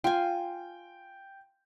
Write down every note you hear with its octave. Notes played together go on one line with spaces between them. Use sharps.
F4 G5 G#5